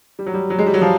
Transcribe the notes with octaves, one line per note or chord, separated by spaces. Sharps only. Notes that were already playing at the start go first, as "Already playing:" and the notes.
G3
F#3
G3
F#3
G#3
G3
F#3
F3